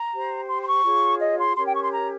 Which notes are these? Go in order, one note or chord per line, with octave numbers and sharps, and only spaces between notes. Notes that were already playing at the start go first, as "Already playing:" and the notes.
Already playing: A#5
G4 C5
C6
C6
C#6
F4 G#4 C#5
D#5
C6
C#4 G4 A#4 C#5 C6
G5
C#6
C6
A#5